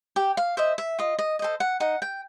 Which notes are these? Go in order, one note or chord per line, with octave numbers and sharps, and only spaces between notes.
G4 G5
F5
C5 D#5 E5
E5
F4 D#5
D#5
A4 C5 D#5
F#5
D#4 F#5
G5